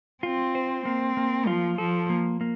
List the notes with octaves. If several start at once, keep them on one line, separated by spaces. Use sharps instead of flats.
C4 F4
C5
A#3 C4
A#3
F3 F4
F3 A4
A#3
A#3